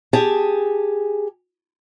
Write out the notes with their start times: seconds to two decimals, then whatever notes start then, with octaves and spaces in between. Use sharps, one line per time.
0.13 G4 G#4 G#5 A5